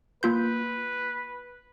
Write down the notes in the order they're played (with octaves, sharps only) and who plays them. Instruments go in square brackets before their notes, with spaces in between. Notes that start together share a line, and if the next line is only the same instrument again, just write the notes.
[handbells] A#3 F4 G6 [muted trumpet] B4